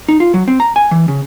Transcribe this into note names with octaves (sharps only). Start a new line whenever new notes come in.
D#4
F4
F#3
C4
A#5
G#5
E3
C#3